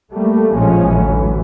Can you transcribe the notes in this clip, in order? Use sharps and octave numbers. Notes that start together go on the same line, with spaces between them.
G3 A3 A#3
A#1 A2 F3 G#3 C#4
A1 D2 E3 F#3